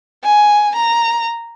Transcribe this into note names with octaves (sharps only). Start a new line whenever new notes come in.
G#5
A#5